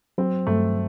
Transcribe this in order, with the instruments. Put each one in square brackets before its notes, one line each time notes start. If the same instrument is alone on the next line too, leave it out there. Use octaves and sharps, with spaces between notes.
[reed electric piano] F#3 [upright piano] C4
[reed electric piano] G2 [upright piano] A3